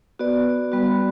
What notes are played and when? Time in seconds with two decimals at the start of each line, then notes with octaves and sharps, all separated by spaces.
0.19 B3 F#4 B4 D5
0.72 G3 B3 F#4